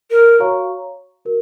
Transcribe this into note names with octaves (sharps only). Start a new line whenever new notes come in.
A#4
F#4 C#5 F5 A#5 C#6
F#4 A#4